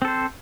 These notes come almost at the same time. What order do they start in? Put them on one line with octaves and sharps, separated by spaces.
C4 A4 C5